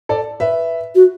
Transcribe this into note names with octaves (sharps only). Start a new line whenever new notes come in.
A4 D5
B4 E5
F#4